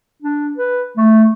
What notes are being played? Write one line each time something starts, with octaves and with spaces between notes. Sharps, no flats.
D4
B4
A3